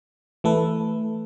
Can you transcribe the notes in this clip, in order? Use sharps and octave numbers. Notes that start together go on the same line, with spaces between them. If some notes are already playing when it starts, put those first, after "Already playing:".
E3 A3 A4 B4